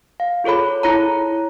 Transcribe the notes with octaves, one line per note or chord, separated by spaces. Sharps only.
F5
F4 G#4 A4 C#5 B5
E4 C#5 A#5